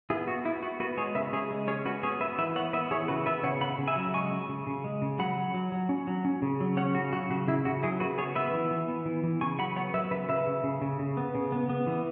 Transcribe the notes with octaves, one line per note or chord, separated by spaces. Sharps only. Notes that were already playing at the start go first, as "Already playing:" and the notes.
B3 E4 G#4
B3 F#4
B3 E4
B3 F#4
B3 F#4 B4
G#3 G#4 C#5
C#3 B4 E5
C#3 G#4 C#5
G#3
C#4 G#4 C#5
C#4 F#4 B4
B3 G#4 C#5
B3 B4 E5
E3 B4 E5
B3 C#5 F#5
B3 B4 E5
E3 G#4 C#5
C#3 F#4 B4
B3 B4 E5
C#3 C#5 F#5
C#3 F#5 B5
C#3
E5 G#5
F#3
G#3 G#5 C#6
C#3
C#3
C#3
G#3
C#3
F#3 F#5 B5
F#3
F#3
F#3
C#4
F#3
C#4
C#3
F#3
C#4 C#5 F#5
C#3 F#4
F#3 F#4
C#3 F#4
C#3 E4
C#3 F#4
F#3 E4 G#4
C#3 F#4 B4
B3 G#4 C#5
B3 B4 E5
E3
E3
B3
E3
E3
C#3 G#5 C#6
F#3 F#5 B5
B3 C#5 F#5
F#3 B4 E5
C#3 B4 E5
C#3 B4 E5
C#3
C#3
C#3
C#3
B3
C#3
B3
B3
E3